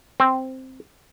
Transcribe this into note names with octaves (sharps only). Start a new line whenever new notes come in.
C4